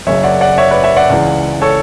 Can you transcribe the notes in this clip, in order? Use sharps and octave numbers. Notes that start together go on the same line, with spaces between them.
F#1 F#2 C#3 C#5 E5
D5 F#5
D5 F#5
C#5 E5
B4 D5
C#5 E5
D5 F#5
C#2 C#3 E3
A4 C#5